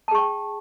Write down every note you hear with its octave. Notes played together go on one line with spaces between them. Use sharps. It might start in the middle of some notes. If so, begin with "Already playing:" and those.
G#4 G5 A5 C#6